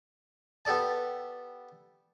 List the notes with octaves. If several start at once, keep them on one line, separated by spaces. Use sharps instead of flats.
B3 G4 A4 D5 A5